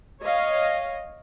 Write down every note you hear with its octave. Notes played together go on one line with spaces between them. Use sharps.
C#5 D#5 F5